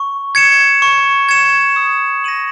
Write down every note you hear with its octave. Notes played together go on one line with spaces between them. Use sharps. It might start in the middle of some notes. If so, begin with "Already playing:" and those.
Already playing: C#6
G#6 C#7 E7
C#6
G#6 C#7 E7
D#6
A#6 D#7 F#7